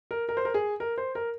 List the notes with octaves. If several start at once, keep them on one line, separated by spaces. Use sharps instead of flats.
A#4
A#4
C5
A#4
G#4
A#4
C5
A#4